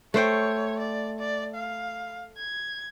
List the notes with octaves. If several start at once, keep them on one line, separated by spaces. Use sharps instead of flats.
A3 C5 C#5 G5
D5
D5
F5
G#6